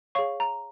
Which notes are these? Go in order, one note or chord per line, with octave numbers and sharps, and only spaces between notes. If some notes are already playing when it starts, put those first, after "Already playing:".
G#4 C#5 F5 C#6
A#5